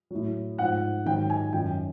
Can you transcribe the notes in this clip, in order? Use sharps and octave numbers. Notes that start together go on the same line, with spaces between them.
A2 F#3
G#2 F3 F#5
G#2 D#3 F#3 G5
G#5
F#2 D#3 F#3 G5